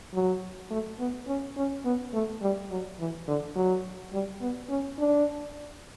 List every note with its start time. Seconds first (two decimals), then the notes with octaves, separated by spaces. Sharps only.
0.14 F#3
0.71 A3
0.99 B3
1.28 C#4
1.57 C#4
1.85 B3
2.14 A3
2.42 G3
2.71 F#3
3.00 E3
3.28 D3
3.56 F#3
4.13 G3
4.41 B3
4.70 C#4
4.99 D4